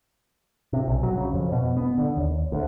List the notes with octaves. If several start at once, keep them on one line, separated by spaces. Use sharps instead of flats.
C3
B1
F#3
C#3
F2
B2
B3
D3
D#2
D2